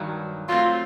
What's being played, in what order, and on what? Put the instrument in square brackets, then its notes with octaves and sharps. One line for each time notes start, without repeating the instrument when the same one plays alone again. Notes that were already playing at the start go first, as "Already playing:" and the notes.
Already playing: [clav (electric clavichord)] G2 D#3 F#3
[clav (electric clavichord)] F#3 A3 C4 [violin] F4